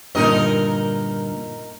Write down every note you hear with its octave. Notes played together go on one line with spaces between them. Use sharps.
G2 A#2 D3 D#4 A#4 D#5